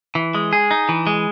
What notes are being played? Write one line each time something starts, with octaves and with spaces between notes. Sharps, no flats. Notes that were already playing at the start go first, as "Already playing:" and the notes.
E3
G#3
G#4
D#4
E3
G#3